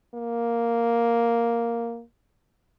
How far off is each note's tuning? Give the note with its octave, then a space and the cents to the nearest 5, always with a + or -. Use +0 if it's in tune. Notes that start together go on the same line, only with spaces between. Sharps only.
A#3 +0